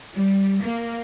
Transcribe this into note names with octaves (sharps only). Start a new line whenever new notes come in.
G3
A#3